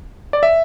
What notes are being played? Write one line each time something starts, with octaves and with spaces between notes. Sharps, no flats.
D5
E5